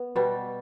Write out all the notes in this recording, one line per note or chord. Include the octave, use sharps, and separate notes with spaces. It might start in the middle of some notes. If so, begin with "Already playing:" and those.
Already playing: B3
B2 G3